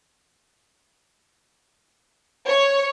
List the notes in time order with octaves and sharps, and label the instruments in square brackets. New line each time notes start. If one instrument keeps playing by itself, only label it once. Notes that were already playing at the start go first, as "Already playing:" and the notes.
[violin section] C#5